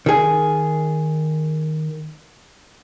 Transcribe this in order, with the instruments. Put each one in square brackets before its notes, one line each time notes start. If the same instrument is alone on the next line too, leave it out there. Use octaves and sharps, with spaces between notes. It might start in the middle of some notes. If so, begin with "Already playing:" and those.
[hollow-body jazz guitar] D#3 G#4